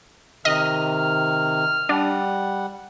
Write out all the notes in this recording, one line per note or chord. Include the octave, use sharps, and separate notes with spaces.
C3 D#3 D#5 F6
G3 D4 F#5